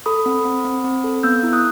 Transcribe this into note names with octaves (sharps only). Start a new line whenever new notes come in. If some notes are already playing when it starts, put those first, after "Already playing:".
A4 B5 D#6
C4
C4
C4
C4
A4
B3 E6 G6
E4
D#6 F#6